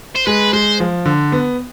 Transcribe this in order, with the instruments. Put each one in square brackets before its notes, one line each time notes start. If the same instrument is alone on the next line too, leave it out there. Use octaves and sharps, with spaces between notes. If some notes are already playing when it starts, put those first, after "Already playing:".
[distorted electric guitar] C5
[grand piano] G#3 [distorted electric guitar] B4
[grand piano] G#3 [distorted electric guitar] C5
[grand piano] F3
D3
B3